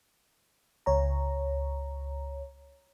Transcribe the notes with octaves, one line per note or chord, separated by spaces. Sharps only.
C#2 C#5 A#5